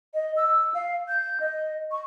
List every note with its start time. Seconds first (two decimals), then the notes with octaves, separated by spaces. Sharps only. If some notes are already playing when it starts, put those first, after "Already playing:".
0.14 D#5
0.37 E6
0.74 F5
1.08 G6
1.40 D#5
1.91 C#6